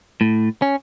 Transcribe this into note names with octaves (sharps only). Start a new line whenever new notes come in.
A2
C#4